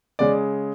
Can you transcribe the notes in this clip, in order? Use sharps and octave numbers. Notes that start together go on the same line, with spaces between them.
C#3 G#3 D5